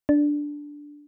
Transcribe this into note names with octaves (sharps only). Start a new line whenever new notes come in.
D4